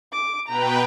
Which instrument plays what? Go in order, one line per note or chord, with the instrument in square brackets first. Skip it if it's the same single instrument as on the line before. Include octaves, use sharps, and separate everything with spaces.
[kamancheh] D6
[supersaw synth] B2 B4 G5 [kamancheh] A#5